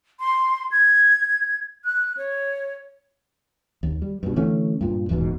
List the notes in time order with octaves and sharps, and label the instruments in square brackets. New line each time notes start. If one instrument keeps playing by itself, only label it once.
[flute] C6
G#6
F#6
C#5
[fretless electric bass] D#2
G3
G2 B2
D3 E3 A3 C#4
G2 A#2
D#1 E2 G#2 B2